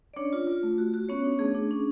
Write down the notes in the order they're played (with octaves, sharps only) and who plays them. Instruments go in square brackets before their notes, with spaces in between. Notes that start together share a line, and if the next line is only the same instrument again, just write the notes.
[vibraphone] D5
C#4 D4 C#5
F4
F4
A3
F#4
F#4
B3 C#4 C#5
D4
A3 G#4
D4
C#4